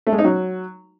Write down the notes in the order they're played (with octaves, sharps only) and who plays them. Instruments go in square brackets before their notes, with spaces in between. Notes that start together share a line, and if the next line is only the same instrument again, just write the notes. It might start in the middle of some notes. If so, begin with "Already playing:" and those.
[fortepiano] A3
G#3
D#4
F#3